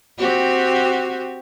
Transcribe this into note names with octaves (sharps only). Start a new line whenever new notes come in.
C4 F#4 G4